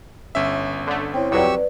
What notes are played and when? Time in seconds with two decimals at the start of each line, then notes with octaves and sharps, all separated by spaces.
0.35 G1 C#4 E5
0.87 D3 A3
1.14 C4 E4 C#5 G5
1.32 C2 F2 F#3 G4 B4 D5 C#6 E6